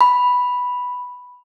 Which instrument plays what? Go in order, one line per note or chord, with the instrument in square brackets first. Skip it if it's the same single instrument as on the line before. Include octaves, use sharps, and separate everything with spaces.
[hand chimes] B5